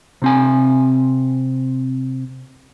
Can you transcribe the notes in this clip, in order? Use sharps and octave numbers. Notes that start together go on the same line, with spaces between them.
C3 C4 G#5